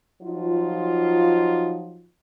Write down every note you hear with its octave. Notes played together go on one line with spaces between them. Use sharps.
F3 F#3 D#4 F4